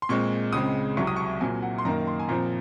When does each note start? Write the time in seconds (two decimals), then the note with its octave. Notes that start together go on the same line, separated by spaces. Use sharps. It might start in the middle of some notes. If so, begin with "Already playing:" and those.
0.02 C6
0.09 A#2 G#3 C4 C#6
0.53 C#2 C#3 G#3 C4 D#6
0.97 C2 C3 F#3 C#6
1.07 D#6
1.16 C#6
1.41 A#2 F#3 C4 G#5
1.63 F#5
1.78 C6
1.85 F#2 D#3 A#3 A#5
2.07 C6
2.19 G#5
2.29 A#2 F3 C4 A#5